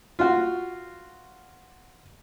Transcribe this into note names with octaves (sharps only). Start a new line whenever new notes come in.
F4 F#4